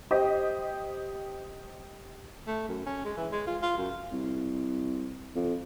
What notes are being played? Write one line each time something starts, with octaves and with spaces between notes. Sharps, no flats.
G4 C5 D#5
A3
F#2
C#4
G#3
E3
G#3
F4
F4
F#2
C2
F2